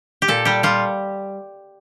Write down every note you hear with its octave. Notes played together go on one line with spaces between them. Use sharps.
G4
A#2 A4
G3 G4
G3 F4